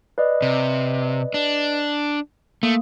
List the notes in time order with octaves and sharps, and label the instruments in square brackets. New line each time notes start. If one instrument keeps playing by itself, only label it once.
[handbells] B4 D5 D#5
[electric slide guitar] C3
D4
[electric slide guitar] A3 [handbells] A#3